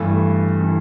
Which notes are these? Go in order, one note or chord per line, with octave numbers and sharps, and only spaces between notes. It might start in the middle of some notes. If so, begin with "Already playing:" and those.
Already playing: G2 E3 A3
E3 A3